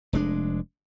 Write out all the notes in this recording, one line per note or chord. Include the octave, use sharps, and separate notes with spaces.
F1 G#3 D4